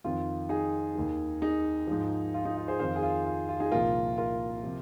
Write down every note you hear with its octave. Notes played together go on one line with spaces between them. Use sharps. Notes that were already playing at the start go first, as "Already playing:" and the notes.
F2 D#3 F4
D#4 G#4
D#2 D#3
D#4 G#4
G#2 F3
F4
D#4
F4
G#4 C5
F2 D#3 C5 F5
G#4
F4
F4
F4
D#4 G#4
C2 A#2 F3 F4 A#4
F4 A#4
C3 F3